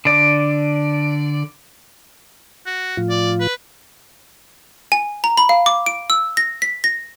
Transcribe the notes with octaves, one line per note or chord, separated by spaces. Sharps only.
D3 D5
F#4
A2 F3 F4
D5
B4
G#5
A#5
B5
F5
D6
D7
E6
A#6
B6
A#6